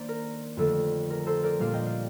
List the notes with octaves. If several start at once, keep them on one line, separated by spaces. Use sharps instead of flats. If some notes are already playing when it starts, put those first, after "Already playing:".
Already playing: D#3 A#3 D4 C5 D5
A#4
F2 D3 A3 D4 A4
A#4
A4 C5
A#4 D5
A#2 G3 A#3 D4 D5 F5
D#5 G5
D5 F5